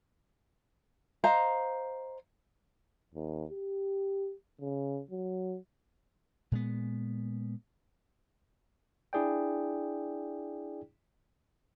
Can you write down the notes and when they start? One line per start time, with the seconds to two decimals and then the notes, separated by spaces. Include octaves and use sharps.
1.24 C5 D#5 F5 A#5
3.14 D#2
3.51 G4
4.60 C#3
5.11 F#3
6.52 A#2 G#3 B3
9.13 D4 E4 G#4 D5 G5